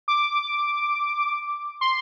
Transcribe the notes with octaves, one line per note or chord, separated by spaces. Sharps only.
D6
C6